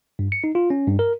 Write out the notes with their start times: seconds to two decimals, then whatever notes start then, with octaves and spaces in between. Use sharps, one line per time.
0.19 G2
0.32 C#7
0.44 D#4
0.55 F4
0.70 C#4
0.88 G2
0.99 A#4